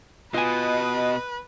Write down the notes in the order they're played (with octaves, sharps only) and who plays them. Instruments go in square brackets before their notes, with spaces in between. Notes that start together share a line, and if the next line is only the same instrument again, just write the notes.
[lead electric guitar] B2 [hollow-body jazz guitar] F4 G#5 [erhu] B4 [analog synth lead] D#5